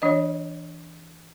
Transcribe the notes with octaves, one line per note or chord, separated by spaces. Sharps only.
E3 D4 C#5 D#5